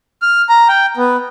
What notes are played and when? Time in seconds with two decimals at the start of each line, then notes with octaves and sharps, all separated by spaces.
0.22 F6
0.49 A#5
0.69 G5
0.97 B3